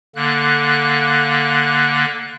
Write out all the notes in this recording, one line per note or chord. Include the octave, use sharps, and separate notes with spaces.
D3 A#3 F#6